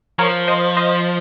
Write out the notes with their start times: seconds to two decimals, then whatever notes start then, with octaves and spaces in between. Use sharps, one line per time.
0.19 F3 A#4 C#5
0.48 C5 D#5
0.77 C5 D#5